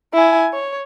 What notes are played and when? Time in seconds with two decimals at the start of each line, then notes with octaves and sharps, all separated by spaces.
0.13 E4 G#5
0.53 C#5